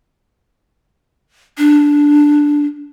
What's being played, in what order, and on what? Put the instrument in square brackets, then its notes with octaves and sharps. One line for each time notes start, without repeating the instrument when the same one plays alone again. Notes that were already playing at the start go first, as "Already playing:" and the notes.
[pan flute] D4